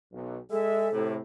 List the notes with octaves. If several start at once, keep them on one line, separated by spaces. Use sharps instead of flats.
B1
G#3 G#4 A4 E5
A2 C3